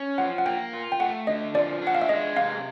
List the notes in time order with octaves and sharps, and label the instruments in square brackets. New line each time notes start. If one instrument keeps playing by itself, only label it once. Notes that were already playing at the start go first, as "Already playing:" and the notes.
Already playing: [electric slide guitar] C#4
[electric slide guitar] F3 [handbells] F#5
[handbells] F#5
[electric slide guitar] A#3 [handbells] G5
[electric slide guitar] F4
[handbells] G5
[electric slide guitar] A3 [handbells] F#5
[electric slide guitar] D3 [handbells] D#5
[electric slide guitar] F3 [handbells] D5
[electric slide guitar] D4
[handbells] F#5
F5
E5
[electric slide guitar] G#3 [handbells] D#5
[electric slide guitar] C3 [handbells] F5